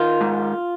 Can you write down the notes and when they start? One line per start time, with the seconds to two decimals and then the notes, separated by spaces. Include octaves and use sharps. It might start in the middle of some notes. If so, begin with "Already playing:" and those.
Already playing: D#3 F4
0.21 G#2